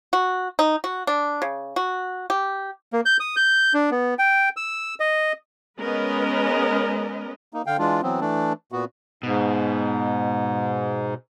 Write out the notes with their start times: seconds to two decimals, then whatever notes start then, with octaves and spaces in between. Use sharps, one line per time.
0.13 F#4
0.59 D#4
0.84 F#4
1.07 D4
1.42 C#3
1.76 F#4
2.30 G4
2.93 A#3
3.06 G6
3.20 D#6
3.36 G6
3.74 D4
3.91 B3
4.19 G5
4.57 E6
5.00 D#5
5.80 G#3 B3 C#4 A#4 B4 D#5
7.54 A#3 D#4
7.66 D3 F5 G5
7.79 E3 G#3 D4 F4
8.03 E3 F#3 B3 C4
8.21 E3 A3 D4
8.72 A#2 B3 F#4
9.23 G#2 B2